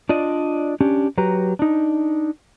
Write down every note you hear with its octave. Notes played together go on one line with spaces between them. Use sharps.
D4 F4 D5 D#5
C#4 D4 G4
F#3 G4 B4 A#5
D4 D#4